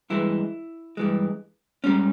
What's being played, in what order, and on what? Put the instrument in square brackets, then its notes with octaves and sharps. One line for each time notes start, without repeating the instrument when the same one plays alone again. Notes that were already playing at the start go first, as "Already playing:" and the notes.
[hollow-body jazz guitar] G2 E3 G#3 E4
G2 E3 G#3
G#2 G3 C#4